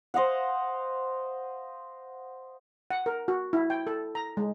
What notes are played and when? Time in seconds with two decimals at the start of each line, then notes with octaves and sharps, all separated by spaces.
0.14 C5 D#5 F5 F#5
2.91 F#5
3.06 A#4
3.28 F#4
3.53 E4
3.70 G5
3.87 A4
4.15 A#5
4.37 G#3